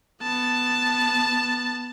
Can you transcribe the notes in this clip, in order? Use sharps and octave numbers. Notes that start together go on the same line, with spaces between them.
B3 A5